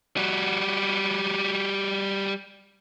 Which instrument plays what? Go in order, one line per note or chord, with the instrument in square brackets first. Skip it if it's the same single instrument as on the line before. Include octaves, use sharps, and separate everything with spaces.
[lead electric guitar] G3 F#4